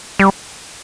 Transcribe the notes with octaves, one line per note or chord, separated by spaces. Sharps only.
G3